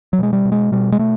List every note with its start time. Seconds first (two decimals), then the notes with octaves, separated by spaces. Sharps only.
0.13 F#3
0.19 B2 G#3
0.33 G3
0.45 B2
0.52 G#3
0.72 B2 G3
0.92 G#3
0.99 B2 A3